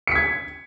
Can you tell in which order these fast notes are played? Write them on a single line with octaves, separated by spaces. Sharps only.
C#7 B6 G#6